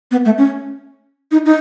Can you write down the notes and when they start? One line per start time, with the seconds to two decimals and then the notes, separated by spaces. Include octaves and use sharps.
0.11 B3
0.25 A3
0.38 C#4
1.32 D#4
1.45 D#4